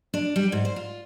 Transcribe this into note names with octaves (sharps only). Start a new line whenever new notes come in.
D4
G3
G#2
C5
F4